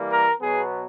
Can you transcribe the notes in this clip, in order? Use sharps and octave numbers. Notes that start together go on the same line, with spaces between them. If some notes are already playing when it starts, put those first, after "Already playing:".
Already playing: E3 G3 A#3
A#4
B2 F#3 B3 G#4